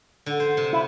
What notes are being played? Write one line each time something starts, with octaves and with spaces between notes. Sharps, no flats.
D3
C5
C3
E4